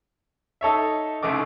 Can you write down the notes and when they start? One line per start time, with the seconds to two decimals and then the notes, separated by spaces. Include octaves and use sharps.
0.61 D#4 A4 C#5 E5
1.23 C2 C#3 A3 D#4 D6